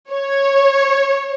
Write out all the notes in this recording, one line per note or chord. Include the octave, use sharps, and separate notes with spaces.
C#5